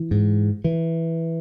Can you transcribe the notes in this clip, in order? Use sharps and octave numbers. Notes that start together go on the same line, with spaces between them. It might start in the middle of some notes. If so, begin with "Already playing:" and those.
Already playing: E3
G#2
E3